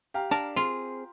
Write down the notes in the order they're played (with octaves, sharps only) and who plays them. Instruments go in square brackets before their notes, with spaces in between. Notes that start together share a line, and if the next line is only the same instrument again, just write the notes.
[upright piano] G4 F5 A#5
[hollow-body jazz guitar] D4 [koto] A#4 [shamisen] A5
[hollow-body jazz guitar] C4 G#4 [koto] F4